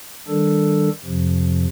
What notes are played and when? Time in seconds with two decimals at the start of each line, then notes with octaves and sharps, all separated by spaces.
0.27 D#3 G3 D4 A4
1.04 F2 C3 F3